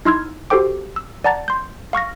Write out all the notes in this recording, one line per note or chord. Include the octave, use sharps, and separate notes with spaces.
D#4 E4 C6 E6 F6 G#6
F#4 G4 A4 C5 G5 D6
E6
D5 F#5 A5 A#5 A6
C6 G6
F5 C#6 F6 A#6